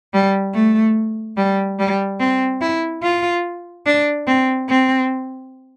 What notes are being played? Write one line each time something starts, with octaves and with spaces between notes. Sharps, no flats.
G3
A3
G3
G3
C4
E4
F4
D4
C4
C4